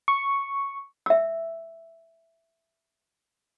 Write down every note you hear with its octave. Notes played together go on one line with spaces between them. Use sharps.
C#6
E5 E6